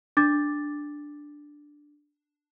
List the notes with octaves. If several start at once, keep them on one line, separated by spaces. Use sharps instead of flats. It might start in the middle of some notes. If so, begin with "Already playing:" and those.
D4 D6 A6